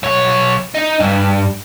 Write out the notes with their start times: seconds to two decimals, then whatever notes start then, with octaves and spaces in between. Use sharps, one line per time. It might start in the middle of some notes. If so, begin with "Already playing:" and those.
0.03 B1 C#5
0.75 D#4
1.00 G2